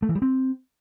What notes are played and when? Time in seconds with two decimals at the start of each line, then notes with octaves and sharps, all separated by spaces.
0.02 A3
0.09 E3
0.15 G3
0.22 C4